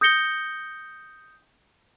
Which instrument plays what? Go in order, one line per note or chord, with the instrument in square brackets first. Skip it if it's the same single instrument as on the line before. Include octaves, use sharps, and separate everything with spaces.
[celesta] D#6 G6 A#6 C#7 G7